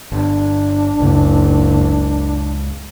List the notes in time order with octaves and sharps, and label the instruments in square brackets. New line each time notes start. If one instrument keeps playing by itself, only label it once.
[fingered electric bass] G1 [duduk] D4
[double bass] F#1 [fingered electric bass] C#2